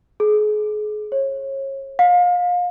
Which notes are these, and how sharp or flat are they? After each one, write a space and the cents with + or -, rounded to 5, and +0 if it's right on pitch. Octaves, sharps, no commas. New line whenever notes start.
G#4 +35
C#5 -30
F5 +30